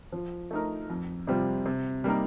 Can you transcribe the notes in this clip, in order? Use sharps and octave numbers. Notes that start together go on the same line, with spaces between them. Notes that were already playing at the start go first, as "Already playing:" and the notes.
F3
A3 D#4 A#4
F2
C3 G3 C4 F4
C3
G3 A#3 D#4 A#4